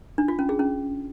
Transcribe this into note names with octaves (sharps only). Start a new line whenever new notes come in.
D4
F4
C#4
G#4
C#4